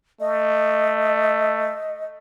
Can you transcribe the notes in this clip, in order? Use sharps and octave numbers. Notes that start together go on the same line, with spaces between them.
A3 D#5